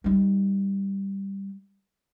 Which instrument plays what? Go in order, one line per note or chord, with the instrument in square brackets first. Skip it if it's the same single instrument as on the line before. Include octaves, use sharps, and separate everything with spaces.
[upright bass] G3 D#4